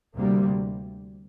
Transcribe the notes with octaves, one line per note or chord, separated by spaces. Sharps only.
D2 C3 G3 A#3